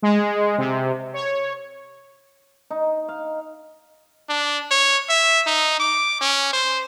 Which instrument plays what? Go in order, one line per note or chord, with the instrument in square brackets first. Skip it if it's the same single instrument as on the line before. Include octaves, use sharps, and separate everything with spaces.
[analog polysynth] G#3
C3
C#5
[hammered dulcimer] D#4
F5
[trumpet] D4
C#5
E5
D#4
D6
C#4
C5